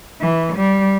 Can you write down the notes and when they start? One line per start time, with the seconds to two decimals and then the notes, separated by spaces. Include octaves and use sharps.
0.21 E3
0.56 G3